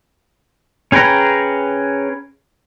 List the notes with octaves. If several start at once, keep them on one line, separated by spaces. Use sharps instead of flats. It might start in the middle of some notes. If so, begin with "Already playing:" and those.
C#4 G#4 B4 G5 A#5